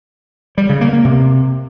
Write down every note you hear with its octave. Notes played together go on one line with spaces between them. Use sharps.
G3
C#3
A#3
A#3
C3